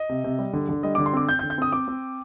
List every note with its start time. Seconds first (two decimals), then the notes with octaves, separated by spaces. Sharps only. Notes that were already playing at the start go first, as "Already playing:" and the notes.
Already playing: D#5
0.09 C3
0.24 C3
0.39 G3
0.53 D3
0.69 D3
0.83 G3 D#5
0.95 D6
0.98 D3
1.06 C6
1.13 C4 D6
1.29 C4 G6
1.39 G6
1.43 D3
1.50 G6
1.58 C4 D#6
1.73 C4 D6
1.88 C4